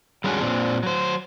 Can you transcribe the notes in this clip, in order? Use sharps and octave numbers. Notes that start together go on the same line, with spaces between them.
G3 G#3 C#4 D4 F#4 G#4
A#2 C4 D4
F#3 C5